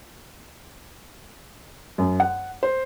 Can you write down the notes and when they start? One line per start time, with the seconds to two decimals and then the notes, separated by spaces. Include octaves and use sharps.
1.98 F#2
2.20 F#5
2.63 C5